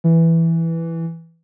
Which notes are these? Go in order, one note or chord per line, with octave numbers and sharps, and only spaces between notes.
E3